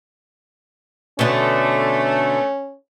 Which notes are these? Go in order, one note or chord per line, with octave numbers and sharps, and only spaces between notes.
B2 D3 A3 C#4